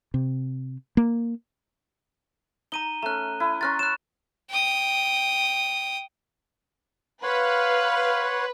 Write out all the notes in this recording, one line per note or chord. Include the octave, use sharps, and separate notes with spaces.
C3
A#3
D#4 A#5 D#7 G7
A3 C#4 A#5 F#6
E4 G#5
C#4 A#4 C6 C#6 F#6 A6
C#5 F#6 E7
G5 D#6
B4 C#5 F5 F#5 C6